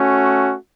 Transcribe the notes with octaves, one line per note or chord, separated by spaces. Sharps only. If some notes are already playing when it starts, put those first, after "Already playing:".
Already playing: A3 C#4 F#4